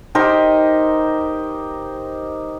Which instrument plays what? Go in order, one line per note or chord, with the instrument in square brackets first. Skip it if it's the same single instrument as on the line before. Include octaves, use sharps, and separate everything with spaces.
[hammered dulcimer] D#4 G4 A#4 C5